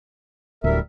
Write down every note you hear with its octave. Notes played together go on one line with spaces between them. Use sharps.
D1 D2 G3 A#4 E5